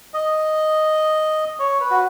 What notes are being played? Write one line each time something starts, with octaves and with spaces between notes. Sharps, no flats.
D#5
C#5
B4
F#4